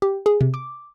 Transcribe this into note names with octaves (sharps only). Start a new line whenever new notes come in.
G4
G#4
C3
D6